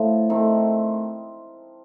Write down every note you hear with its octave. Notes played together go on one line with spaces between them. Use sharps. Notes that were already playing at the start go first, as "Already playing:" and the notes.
Already playing: A2 F3 A3
D#3 A3 C4